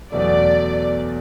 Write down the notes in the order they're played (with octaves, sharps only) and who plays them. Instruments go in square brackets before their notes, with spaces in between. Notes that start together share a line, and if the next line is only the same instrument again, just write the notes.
[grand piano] E2 B2 F#3 A3 [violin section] D5